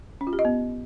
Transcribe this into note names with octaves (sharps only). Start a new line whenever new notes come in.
C#4
F4
G4
D#5
B3